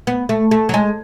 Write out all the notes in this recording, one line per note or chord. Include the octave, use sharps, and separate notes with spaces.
B3
A3
A3
F#3
G#3